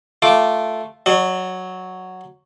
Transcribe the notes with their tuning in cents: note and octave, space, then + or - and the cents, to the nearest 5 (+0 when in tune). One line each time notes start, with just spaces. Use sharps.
A3 +0 F4 +5 D6 +0
F#3 +0 D5 +45